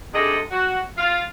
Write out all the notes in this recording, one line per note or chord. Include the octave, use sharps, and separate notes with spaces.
G#2 C3 G#3 D4 A4 D#5
F#4
F4 F5